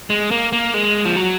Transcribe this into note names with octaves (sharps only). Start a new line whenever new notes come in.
G#3
A#3
A#3
G#3
F3
F#3